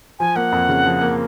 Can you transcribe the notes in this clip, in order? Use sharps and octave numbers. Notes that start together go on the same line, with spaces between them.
F3 G#5
A#3 F#5
F2
C#3
F3
A#3